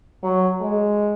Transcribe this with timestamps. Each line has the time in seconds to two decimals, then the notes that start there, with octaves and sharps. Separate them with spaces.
0.23 F#3
0.61 G#3